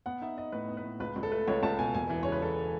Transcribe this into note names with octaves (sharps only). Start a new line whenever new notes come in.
B3 F#5
D#4 E5
D#4 D#5
A2 B4
B3
B4
A2
C#2 B4
C#2
A4
A3 B4
C#2 C#5
C#2 A5
B2 G#5
E1 G#5
E3
C#3 C#5
B4
E3 A4